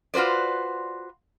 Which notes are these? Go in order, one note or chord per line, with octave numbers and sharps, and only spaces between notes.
F4 F#4 B4 C5 D5